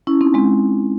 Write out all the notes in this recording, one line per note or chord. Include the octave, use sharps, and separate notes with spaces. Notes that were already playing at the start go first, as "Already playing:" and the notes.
C#4 E4
C4 D#4
G#3 C4